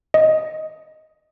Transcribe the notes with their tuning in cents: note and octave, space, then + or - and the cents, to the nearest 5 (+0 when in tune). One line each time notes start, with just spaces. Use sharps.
D#5 +10